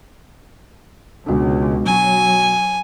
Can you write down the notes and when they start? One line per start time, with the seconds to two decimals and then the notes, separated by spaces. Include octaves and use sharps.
1.26 C#2 B2 D3
1.86 F#3 G#5